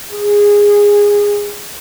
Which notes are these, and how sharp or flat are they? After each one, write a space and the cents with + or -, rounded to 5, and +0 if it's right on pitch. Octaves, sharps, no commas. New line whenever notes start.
G#4 -15